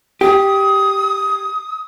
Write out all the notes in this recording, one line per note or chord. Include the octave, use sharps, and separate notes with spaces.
G4 D#6